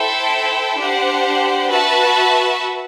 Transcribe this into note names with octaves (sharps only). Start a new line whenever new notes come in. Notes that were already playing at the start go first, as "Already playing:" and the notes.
Already playing: E4 A4 C5 E5 G5
D4 G4 C5 F#5
F#4 B4 E5 A5